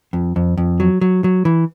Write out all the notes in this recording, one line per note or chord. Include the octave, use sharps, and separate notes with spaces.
F2
F2
F2
F#3
F#3
F#3
E3